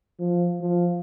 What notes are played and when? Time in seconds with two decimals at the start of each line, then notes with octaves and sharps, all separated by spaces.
0.19 F3
0.60 F3